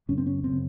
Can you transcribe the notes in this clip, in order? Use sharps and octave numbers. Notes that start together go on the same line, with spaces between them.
F#2 C#3 C#4
C4
C#4
F#2 C#3 C4